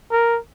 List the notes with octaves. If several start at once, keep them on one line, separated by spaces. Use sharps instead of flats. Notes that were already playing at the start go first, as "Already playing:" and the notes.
A#4